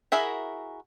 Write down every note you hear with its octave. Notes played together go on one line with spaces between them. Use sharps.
E4 F#4 G#4 A#4 E5